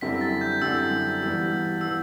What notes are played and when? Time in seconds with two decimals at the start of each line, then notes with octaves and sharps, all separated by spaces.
0.01 F#2 D3 G3 C4 E4 B6
0.21 A6
0.41 G6
0.61 F#2 D3 G3 C4 E4 E6
1.22 G2 E3 G3 B3 F#4
1.81 E3 G3 B3 F#4 E6